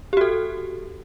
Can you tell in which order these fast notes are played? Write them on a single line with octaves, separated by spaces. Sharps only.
G4 F#4 A4